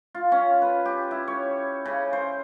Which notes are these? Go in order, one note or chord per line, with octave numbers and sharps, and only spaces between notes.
F4
C#4
B4
G4
E4
C#5
C#3
C5